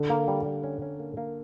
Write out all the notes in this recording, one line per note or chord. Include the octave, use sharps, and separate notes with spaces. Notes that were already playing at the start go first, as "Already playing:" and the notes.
Already playing: D3
A#3
G3
G3
C#4
C#4
A#3
A#3